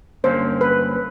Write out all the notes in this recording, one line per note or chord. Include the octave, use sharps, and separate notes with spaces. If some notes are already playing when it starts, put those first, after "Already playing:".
G2 D3 F#3 A#3 C#4 C5
B4